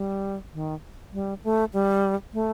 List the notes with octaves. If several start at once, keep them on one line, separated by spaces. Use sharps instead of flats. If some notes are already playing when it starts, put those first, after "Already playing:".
Already playing: G3
D#3
G3
A3
G3
A3